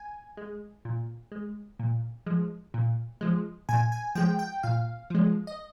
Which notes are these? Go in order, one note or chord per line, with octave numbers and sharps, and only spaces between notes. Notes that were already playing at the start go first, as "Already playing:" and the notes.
Already playing: G#5
G#3
A#2
G#3
A#2
F3 G#3
A#2
F3 G#3
A#2 G#5
G#5
F3 G#3 G5
G5
A#2 F5
F3 G#3
D#5